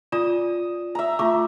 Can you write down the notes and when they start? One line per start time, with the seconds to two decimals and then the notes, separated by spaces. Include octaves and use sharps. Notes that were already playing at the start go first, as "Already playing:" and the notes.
0.12 F4 D5 D#6 E7
0.95 E5 A#5
1.19 A3 F4 D6